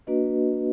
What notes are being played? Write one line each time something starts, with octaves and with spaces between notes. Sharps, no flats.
A#3 D4 F#4 B4 D#5